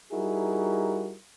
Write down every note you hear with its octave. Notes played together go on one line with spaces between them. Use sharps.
G3 D#4 E4 F#4 G#4 A#4